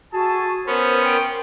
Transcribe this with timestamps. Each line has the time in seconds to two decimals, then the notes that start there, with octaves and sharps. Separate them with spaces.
0.13 F#4 G#4 A4 A5
0.67 B3 C#4 A#4 C5
1.03 G5 C6